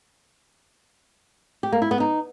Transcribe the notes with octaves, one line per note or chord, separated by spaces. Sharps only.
G4
A#3
E4
B3
D#4